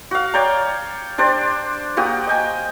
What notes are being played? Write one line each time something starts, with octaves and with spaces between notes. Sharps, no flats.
F#4 F5
C#5 D5 G5 A#5
D4 G4 C5 D5
A#3 F#4 G4 D#6
D#5 G5 G#5